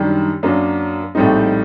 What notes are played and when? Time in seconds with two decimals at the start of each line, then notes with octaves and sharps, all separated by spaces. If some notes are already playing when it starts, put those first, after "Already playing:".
Already playing: F#2 D#3 G3 D4
0.43 F#2 F#3 A#3 D4
1.15 A#1 A2 G3 C4 D#4